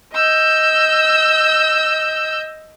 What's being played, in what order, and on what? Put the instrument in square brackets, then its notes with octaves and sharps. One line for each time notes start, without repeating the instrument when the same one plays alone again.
[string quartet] D#5 E6 G6